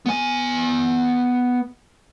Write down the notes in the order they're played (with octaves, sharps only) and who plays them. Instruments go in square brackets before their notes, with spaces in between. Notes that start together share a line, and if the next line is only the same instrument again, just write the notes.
[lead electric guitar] B3 G#5